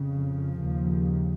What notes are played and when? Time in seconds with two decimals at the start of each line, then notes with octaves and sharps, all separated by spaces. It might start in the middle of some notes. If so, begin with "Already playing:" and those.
Already playing: F2 C#3
0.15 F3
0.61 D#2 C#3